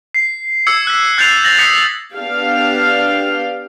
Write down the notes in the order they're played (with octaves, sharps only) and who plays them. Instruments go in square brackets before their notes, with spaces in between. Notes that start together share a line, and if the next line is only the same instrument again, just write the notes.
[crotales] C7
D6 E6 G#6 C#7
F#6 B6
F#6 G6 A6 C7 C#7 F7
A6 A#6 F#7
D#6 G6 B6 C#7
[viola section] B3 D4 G4 F5